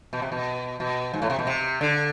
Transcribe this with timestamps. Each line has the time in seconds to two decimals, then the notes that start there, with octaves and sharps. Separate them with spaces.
0.13 B2
0.22 C3
0.32 B2
0.80 B2
1.14 G#2
1.22 A2
1.30 C3
1.39 B2
1.47 C3
1.81 D3